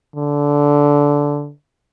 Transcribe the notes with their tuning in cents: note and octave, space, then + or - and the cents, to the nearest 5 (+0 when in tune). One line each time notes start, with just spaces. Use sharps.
D3 -15